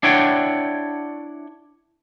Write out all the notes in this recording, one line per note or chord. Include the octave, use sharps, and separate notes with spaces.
D4 E4 C#5 F#5 G5